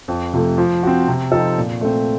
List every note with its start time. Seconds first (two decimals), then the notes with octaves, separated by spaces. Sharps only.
0.08 F2
0.33 C3 F3 A3
0.58 F3
0.83 C4 F#4
1.08 C3
1.32 F3 C4 D#4 A4
1.58 A#2
1.81 A3 C4